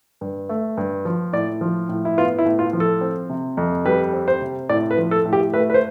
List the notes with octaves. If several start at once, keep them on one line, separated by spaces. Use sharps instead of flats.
G2
A3
G2
F3
A2 D5
F3
A2
E4
B3 F4
E4
A2
F4
F3
A4
C4
C3
F2
G3 B4
C4
C5
C3
A2 D5
B4
F3
A4
A2
G4
A3 B4
B4
C5